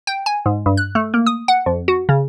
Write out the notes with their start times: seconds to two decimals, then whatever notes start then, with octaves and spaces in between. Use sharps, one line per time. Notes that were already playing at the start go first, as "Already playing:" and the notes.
0.07 G5
0.26 G#5
0.46 G#2
0.66 G2
0.77 F#6
0.95 A3
1.14 A#3
1.26 D#6
1.48 F#5
1.66 F2
1.88 F#4
2.09 C#3